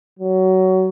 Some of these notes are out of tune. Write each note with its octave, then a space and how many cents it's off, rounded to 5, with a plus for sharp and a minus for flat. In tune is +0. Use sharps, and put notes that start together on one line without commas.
F#3 +20